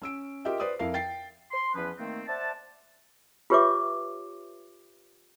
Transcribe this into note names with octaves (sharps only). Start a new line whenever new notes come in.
C#4 E6 D7
F4 G4 A#4 D#5 E5 G5
B4 C5 D5 D#6
F2 E4 A#4 F5 C7
G5 A6 C7
C6
E2 F3 C#4 B4
D#3 A3 A#3 C4
C5 D5 E5 F#5 A5
F4 G4 B4 C#5 E5 D6